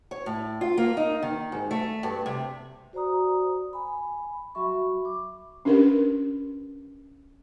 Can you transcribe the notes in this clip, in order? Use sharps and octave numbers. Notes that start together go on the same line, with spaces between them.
C#5
A2
F4
A#3
D#4
D#3
G#2
A3
G2
C3
F#4 C5 D5 A#5 D#6
G#5 B5
F#3 F#4 E5 B5 C#6
D6
C#4 D4 G4 A#4 B4